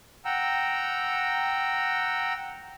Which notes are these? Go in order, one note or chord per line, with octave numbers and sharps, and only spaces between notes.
F#5 G5 A#5 E6